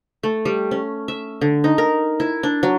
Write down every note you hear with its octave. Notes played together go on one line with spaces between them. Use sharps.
A3
G3
C#4
E5
D3
D#4
A#4
E4
D4
F#3